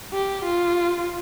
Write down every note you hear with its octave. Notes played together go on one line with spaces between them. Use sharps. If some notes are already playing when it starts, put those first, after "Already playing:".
G4
F4